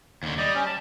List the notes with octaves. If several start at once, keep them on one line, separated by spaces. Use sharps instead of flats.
D#2 D3
G3 D5 D#5
C#4
A5